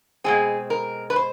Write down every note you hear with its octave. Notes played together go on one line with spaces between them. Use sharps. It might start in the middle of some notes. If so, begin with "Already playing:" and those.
B2 G#3 C4 G#4
A#4
B4
C5